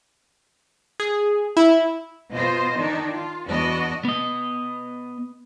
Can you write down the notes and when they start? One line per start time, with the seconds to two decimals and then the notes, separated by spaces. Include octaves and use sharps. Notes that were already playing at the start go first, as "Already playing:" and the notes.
1.00 G#4
1.57 E4
2.33 B2 F4 C5 D#5
2.77 D#3 D4 D#4
3.11 F4
3.48 E2 B3 D4 F#4 D#5
4.05 B3 D#5